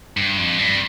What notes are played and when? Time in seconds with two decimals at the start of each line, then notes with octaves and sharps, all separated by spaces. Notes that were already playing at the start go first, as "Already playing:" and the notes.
0.17 G2
0.38 F2
0.59 G2